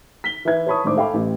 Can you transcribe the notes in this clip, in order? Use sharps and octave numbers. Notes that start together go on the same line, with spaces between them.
B6 G7
E3 E4 B4 E5 G#6
B4 C#5 A5 B5 C#6 D#6
G#1 A2 D4 C5 D6
A4 F5 G5 B5 D6
A1